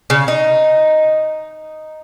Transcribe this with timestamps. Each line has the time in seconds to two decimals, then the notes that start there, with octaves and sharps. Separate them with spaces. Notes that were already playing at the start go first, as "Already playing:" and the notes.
0.10 C#3
0.28 D#4